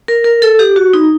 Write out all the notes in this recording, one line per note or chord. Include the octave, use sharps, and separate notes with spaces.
A#4
A#4
A4
G4
F#4
D#4